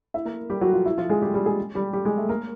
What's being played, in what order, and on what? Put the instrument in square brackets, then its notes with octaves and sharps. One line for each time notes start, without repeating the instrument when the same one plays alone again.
[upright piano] E4 E5
A#3 A#4
G3 G4
F#3 F#4
F3 F4
E4
F3 F4
G#3 G#4
G3 G4
G3 G4
G#3 G#4
G3 G4
G3 G4
G#3 G#4
A3 A4
A#3 A#4